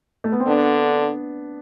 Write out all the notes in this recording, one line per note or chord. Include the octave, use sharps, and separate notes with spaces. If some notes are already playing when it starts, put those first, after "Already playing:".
A3
B3
C4
D3 B3 D4